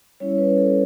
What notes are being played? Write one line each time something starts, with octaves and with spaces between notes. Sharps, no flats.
G3 C#4 E4 C#5
B4
A4